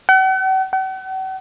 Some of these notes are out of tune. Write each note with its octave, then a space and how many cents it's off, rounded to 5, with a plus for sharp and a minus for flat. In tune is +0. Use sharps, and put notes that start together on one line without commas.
F#5 +45
F#5 +45